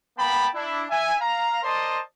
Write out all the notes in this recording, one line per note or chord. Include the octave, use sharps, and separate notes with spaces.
A#3 B3 G5 A5 B5
D4 E4
E5 G#5
F5 A#5
A#4 C5 D5 D#5 A5 C6